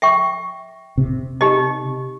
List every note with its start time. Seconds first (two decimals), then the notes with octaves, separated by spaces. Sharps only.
0.02 E5 G5 C#6
0.98 C3
1.41 D#4 G4 D#5